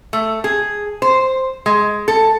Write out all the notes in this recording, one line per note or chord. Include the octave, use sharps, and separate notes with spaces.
A3
G#4
C5
G#3
A4